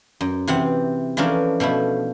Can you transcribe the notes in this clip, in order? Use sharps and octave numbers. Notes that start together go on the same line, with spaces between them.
F#2
C3 E3 C4 F#5
E3 F3 C#4 D4 A4 A#4
B2 F3 A3 E4